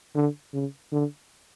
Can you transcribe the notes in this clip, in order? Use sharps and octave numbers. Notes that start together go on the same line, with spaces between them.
D3
C#3
D3